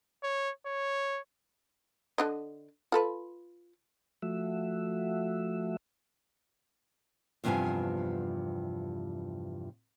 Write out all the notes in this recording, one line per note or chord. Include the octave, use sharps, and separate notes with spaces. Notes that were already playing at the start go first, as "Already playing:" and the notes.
C#5
C#5
D3 D4 D#5
F4 A4 B4
F3 A3 F#4 E5
E2 G2 C3 F3 B3 G#5